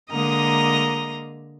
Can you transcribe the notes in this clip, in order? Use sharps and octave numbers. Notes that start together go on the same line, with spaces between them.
D3 G#3 A#3 D#5 A#5 D#6